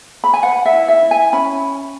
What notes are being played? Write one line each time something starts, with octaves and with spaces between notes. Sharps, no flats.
B5
G#5
B4 F#5
E5
E4
E5
E4
G#5
C#4 B5